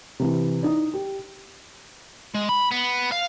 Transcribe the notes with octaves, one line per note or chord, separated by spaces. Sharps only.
C3 E3
D#4 E4 D5
G4
G#3
B5
B3
F5